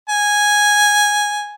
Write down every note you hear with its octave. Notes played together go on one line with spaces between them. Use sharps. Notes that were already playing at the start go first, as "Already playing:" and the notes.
G#5